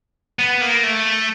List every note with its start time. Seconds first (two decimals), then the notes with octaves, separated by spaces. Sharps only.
0.39 B3
0.61 A#3
0.83 A3